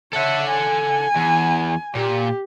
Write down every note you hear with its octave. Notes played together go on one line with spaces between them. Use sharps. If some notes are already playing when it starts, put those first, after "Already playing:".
A4 C#5 E5 F#5
G#5
E2
A#2 G4